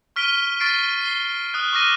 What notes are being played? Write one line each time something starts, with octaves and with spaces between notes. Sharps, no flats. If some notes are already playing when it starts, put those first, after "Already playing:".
C#6 F6 B6 D7 D#7 G7
C#6 F6 A6 B6 C7 D7
C7 G7
D#6 F6 F#6
C#6 D6 F6 A#6 D#7